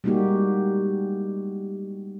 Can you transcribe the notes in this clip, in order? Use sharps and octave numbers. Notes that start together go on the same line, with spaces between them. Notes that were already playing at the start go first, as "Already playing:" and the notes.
G3 G#3 A#3 D#4 F#4 G4